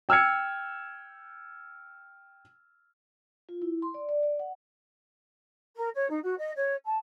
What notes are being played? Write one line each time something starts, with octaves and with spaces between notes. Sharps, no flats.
G5 E6 F6 G#6 C#7
F4
E4
C6
D5
D5
D5
F#5
A#4
C#5
D#4
F#4
D#5
C#5
A5